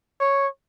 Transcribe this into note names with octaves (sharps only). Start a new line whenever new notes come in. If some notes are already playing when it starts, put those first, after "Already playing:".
C#5